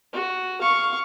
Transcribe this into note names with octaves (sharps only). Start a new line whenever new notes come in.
F#4
F5 C#6